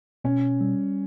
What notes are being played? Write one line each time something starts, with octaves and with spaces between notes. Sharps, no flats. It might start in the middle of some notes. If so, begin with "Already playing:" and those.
B2 C#4
G3